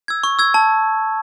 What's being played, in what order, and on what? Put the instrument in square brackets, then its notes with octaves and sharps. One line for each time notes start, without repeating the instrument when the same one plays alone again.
[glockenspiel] E6 G#6
C#6
E6 G#6
A5